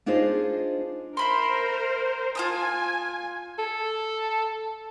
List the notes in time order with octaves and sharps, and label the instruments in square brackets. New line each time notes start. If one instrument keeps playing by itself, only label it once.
[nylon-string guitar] D4 D#4 F4 G#4 C5 D#5
[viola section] A#4 C5 [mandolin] E5 B5 C6
[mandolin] F4 A5 D#6 [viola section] G#5
[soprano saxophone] A4